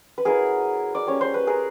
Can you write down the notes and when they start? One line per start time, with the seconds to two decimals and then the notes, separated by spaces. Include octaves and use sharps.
0.18 B4
0.25 F#3 B3 E4 G#4 A#4
0.95 D5
1.06 G3 A#3 C#4 F4 C#5
1.21 C5
1.34 B4
1.47 G#4 A#4